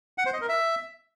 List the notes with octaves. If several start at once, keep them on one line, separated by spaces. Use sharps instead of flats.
F#5
C5
D#5
A#4
E5